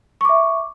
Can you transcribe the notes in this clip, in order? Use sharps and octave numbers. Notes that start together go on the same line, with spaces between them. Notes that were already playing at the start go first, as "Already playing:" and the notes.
E5 C#6 D6